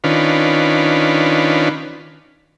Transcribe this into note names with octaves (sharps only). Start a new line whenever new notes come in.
D#3 C#4 D4 F4 B4